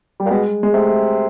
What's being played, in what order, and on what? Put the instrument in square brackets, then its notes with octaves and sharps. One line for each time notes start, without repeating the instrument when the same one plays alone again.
[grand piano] G3
[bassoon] A#2
[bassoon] B2 [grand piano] G#3
[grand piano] G#3
[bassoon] C3 [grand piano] A3